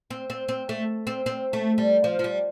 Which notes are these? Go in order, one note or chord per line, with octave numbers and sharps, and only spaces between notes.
C4
C4
C4
A3
C4
C4
A3
G3
F3
F3
G3